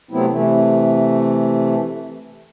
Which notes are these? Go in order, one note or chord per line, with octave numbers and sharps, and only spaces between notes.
C3 F#3 A3 B3 C4 E4
C3 E3 A3